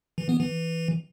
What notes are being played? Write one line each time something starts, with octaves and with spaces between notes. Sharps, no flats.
E3
B3
E3